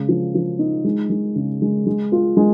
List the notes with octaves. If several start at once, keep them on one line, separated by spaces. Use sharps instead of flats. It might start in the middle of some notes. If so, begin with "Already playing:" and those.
Already playing: C#3 G#3
F3
F3
D#4
G#3
G#3
C#3
G#3
G#3
F4
G#3